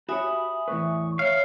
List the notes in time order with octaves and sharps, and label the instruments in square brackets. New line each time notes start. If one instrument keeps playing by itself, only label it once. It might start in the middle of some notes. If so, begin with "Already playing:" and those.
[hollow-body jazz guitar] F#4 G4 C#5 [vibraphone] E5 G#5 D#6 [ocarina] B5
[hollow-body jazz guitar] E2 A2 B4 [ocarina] C#6
[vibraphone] C#5 [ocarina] E5 [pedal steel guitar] F5